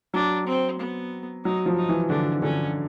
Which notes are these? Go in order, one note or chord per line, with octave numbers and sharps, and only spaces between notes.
F#3 D4
C4
B3
F#3 D#4
F3
D#4
E3
D3 D4
D3 C#4